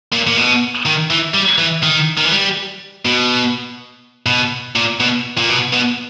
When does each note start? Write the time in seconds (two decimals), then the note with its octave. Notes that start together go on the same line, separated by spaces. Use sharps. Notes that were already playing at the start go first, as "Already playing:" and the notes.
0.12 A#2
0.27 A#2
0.37 B2
0.86 D#3
1.10 E3
1.34 G3
1.58 E3
1.83 D#3
2.17 D#3
2.25 E3
2.31 G3
3.05 B2
4.26 B2
4.76 A#2
5.00 B2
5.38 A#2
5.49 B2
5.73 B2